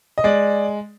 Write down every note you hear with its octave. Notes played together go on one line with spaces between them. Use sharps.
D#5
G#3 D5